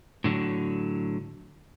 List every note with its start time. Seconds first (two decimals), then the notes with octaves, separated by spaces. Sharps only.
0.24 A2 D3 F#3